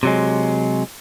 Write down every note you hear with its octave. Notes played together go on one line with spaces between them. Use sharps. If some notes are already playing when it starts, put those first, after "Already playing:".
C3 F#3 G#3